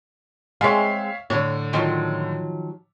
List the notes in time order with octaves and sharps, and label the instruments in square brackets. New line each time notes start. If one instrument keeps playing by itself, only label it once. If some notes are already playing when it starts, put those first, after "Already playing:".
[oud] G#3 C4 [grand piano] C#5 E5 F5
[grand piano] A2 D3 [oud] C#5
[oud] D#3 F3 F#3